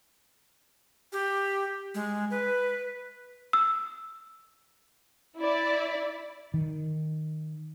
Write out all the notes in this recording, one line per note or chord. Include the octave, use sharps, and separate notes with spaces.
G4
G#3
B4
E6
E4 D5
D#3